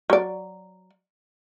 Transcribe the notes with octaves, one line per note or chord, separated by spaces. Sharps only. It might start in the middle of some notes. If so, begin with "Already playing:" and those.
F#3 D5